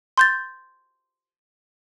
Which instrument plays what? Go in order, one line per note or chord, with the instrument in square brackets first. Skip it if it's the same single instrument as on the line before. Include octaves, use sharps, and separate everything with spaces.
[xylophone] C6 G6 A6